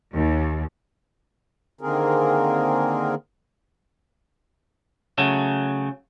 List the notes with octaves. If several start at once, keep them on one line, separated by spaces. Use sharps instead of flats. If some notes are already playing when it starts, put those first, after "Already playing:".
D#2
D3 D#3 A#3 C4 G#4 A#4
C#3 F#3 A3